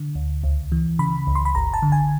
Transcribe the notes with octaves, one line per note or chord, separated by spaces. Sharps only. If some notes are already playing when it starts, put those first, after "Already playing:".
Already playing: D3
D2
C#2
E3
C#3 B5
C#2
C6
B5
G1 A#5
A5
D3
G#5